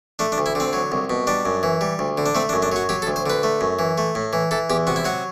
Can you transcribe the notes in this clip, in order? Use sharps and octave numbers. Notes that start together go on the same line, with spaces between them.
A3 D4
D4
D2
E4
D3 C4
F#3
C2
B2
G3 D4
F#2
E3
G3
D2
D3
D4
A3 C4
D4
F#2
D4
F#3 F#4
F#3 G4
A4
D2
C5
D3 B4
A3
F#2
E3
A3
A2
E3
E3 A4
E2 G4
C3 F#4
E4
F#3 F#4